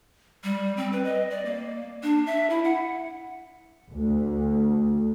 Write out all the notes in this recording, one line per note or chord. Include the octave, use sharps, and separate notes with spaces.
G3
C4
B4
D#5
D5
A#3
D4
E5
E4
F#5
D2